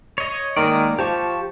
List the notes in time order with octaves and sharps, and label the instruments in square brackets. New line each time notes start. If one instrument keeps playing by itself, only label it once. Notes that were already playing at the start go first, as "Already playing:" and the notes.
[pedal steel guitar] C#5 D#5
[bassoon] D#3 [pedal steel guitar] G#3 A#3 D5
[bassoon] F3 [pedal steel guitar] G4 A5 C#6